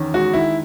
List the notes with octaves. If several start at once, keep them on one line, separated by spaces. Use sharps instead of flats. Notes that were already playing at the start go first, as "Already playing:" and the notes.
Already playing: E2 D#3 C#4
G#3 F#4
D#3 E4